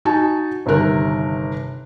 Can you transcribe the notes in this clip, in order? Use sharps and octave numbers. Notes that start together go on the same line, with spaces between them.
D#4 F#4 G#5 A5
G1 C3 D#3 A#4 F#6